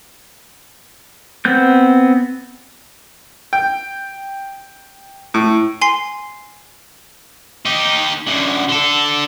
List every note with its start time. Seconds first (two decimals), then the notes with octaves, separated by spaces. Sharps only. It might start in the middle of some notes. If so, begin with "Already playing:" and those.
1.45 B3 C4 G6
3.53 G5
5.34 A2
5.81 G#5 C6 C7
7.65 D#4 G4
8.27 F#2 D3
8.69 D3 A4